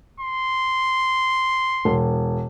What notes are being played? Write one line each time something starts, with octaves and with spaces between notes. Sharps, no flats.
C6
E1